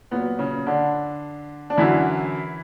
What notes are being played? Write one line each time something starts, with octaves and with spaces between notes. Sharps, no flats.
A#2 F#3 B3
C#3 C#4
D3 D4
D4
F#2 D3 E3 F#3 E4